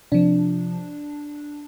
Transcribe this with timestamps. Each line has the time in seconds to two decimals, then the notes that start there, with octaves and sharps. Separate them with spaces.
0.12 C3 F3 D4